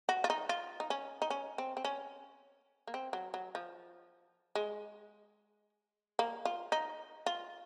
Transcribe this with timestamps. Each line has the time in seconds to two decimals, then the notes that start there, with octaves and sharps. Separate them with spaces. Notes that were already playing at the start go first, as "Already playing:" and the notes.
0.09 F#4
0.24 F4
0.30 D#4
0.49 F4
0.80 D#4
0.90 C#4
1.22 D#4
1.30 C#4
1.58 C4
1.77 C4
1.85 C#4
2.87 A#3
2.94 C4
3.13 F#3
3.34 F#3
3.55 F3
4.55 G#3
6.19 A#3
6.45 F4
6.72 D#4
7.26 F4